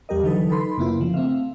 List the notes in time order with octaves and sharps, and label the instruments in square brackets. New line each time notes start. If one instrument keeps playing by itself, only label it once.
[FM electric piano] E2 G3 G4 A#4 D#5
D3 E3 F#3 D#4 A4 B4
D#4 A4 B4 B5 C6
F#2 C#3 A#3 B3 E4 F4
C#3 F3
A3 C4 E5 F5